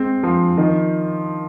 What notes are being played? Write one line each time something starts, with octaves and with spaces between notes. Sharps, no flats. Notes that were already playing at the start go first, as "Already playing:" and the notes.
Already playing: G#3 C4
F3
D#3